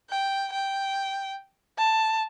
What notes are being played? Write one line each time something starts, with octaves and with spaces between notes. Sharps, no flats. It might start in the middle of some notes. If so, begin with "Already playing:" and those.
G5
G5
A5